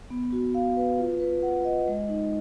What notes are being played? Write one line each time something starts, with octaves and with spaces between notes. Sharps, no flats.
B3
F#4
F5
B4
F4
B4
F#5
D#5
G#3
D#4